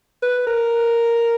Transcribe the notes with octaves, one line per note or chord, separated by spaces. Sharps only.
B4
A#4